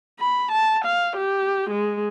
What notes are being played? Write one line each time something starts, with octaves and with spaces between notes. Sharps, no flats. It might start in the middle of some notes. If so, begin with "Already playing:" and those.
B5
A5
F5
G4
G#3